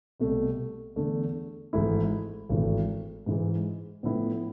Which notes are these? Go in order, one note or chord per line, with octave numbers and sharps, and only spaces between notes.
C2 B2 A3
E2 D3 A3 D4
G#1 G#2 E3 A3 E4
G#1 G#2 E3 A3
G#2 E3 G#3
A2 F3 B3 E4